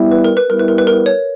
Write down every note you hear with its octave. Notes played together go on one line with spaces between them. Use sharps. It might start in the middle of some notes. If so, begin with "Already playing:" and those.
Already playing: G3 B3 E4
B4
A#4
B4
G3 B3 E4 A#4
B4
A#4
B4
A#4
C#5